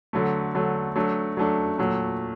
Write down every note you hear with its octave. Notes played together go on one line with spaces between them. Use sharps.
D3 F#3 A3
D3 F#3 A3
F#3 A3 D4
F#3 A3 D4
A#2 F#3 A3